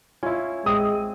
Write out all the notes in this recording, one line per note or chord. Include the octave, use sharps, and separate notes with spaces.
C#4 E4 F4
G#3 C4 D#6